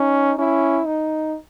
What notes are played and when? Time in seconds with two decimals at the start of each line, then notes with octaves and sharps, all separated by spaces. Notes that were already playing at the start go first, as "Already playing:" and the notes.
Already playing: C#4 D#4
0.38 C#4 E4
0.86 D#4